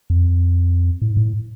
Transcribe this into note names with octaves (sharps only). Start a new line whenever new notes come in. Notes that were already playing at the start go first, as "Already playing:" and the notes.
F2
A2
G#2
A2